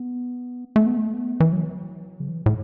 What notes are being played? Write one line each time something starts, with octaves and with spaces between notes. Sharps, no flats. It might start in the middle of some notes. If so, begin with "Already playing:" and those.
Already playing: B3
A3
B3
A3
B3
E3
F#3
C#3
E3
A2